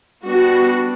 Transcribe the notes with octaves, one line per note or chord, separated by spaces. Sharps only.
G3 B3 D4 F#4